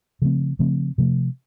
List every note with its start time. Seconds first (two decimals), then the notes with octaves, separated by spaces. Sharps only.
0.22 C#3 F3 A3 C4
0.59 C#3 F3 A3 C4
0.98 C3 F3 A3